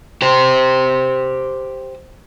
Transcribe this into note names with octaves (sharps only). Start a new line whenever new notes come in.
G4 C5